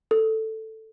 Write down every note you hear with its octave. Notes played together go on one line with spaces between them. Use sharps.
A4